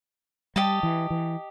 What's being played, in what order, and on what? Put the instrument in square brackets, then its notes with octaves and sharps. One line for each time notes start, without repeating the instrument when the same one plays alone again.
[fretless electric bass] G3 [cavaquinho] G4 D#5 A5
[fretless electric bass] E3
E3